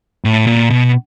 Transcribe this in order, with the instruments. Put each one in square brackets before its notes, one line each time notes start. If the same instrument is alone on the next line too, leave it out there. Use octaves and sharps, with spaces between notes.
[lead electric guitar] A2
A#2
B2